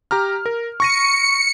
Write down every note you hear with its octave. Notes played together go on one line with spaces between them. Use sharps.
G4 A#5 F6
A#4
C#6 A#6 C#7 D#7